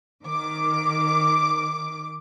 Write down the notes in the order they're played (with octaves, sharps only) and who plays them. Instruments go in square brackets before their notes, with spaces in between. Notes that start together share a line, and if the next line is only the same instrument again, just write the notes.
[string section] D#3 D6